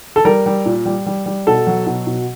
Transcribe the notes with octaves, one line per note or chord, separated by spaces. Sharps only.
A4
G3 A#4
G3
A#2
G3
G3
G3
B2 A4
F#3
B2
B2